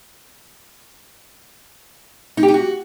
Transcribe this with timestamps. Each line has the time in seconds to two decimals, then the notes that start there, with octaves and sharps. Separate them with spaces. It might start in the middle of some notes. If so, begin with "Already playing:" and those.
2.37 D#4
2.43 G4
2.48 D#4
2.54 F#4